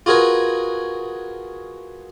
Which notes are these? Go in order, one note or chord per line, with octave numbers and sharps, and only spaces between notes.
F4 F#4 G#4 A#4 B4